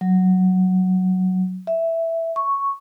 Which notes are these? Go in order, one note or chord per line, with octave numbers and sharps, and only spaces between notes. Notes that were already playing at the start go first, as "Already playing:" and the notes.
F#3
E5
C#6